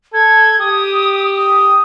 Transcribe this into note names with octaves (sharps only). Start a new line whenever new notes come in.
A4 G#6
G4 D#6
D#6